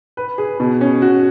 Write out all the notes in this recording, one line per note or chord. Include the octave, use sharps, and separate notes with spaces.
B4
G#4
B2
C#4
F#4